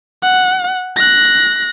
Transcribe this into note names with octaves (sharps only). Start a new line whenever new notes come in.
F#5
F#6 A#6